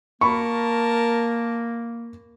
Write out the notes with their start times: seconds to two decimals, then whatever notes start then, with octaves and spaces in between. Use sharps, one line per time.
0.21 A#3 A#4 A5 B5 C#6